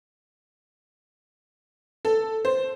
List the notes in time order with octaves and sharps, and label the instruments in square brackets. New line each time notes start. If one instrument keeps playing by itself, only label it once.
[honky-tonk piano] A4
C5